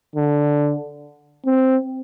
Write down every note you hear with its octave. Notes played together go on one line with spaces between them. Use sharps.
D3
C4